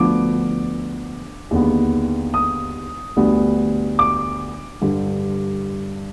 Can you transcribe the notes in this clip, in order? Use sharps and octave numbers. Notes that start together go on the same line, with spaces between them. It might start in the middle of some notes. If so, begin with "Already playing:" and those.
Already playing: D2 D3 F3 B3 D6
D#2 D3 G#3 B3
D#6
D2 D3 G3 B3
D6
G2 D3 G3